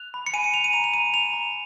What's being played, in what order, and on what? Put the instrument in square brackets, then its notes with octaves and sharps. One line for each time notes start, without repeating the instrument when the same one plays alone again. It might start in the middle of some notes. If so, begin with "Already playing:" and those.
Already playing: [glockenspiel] F#6 F7
B5
C#7
G#5 D#7
D#7
G#5 F7
D#7
A#5 F7
F7
A#5 D#7
A#5 F7
A#5